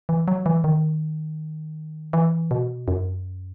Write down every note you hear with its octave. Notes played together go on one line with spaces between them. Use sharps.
E3
F#3
E3
D#3
E3
B2
F#2